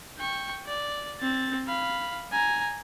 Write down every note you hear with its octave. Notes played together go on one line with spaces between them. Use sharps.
G5 C#6
D5
C4 A6
F5 B5
G#5 A#5